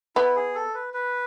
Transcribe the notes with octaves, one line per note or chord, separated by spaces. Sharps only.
B3 E4
G#4
A4
B4
B4